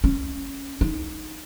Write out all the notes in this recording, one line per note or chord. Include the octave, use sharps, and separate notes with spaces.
C#4
D#4